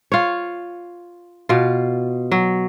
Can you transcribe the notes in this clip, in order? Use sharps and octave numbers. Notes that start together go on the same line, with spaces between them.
F4 C#5
B2 F4
F#3